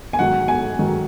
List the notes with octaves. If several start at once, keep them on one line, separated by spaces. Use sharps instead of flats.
G#5
G#2 D#3 F#3 F#5
G#5
G#2 D#3 F#3